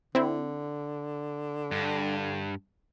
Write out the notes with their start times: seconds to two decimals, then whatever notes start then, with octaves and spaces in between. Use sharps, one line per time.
0.15 D3 C4 E4
1.71 G2